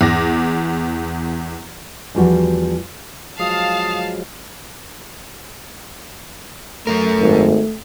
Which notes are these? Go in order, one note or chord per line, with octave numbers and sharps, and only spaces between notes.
E2 D6 A#6
E2 F3 G3 F#4
F3 F#3 G#3 F5 A5 D#6
F#2 A#2 A3 A#4
G#1